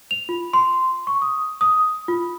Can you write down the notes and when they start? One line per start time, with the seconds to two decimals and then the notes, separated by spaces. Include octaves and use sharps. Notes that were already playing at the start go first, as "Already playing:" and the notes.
0.11 F7
0.29 F4
0.53 C6
1.07 C#6
1.22 D#6
1.61 D#6
2.08 F4